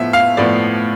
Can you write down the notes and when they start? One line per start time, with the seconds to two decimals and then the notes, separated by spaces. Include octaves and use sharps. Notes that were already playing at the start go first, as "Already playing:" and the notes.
Already playing: A2 F3 B3 E5
0.13 F5
0.37 A2 F3 B3 D5